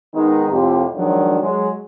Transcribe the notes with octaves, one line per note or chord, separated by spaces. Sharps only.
D#3 G#3 B3 D#4
F2 A2 C3 F4 G4
D#3 F3 F#3 G#3 D4
F#3 G#3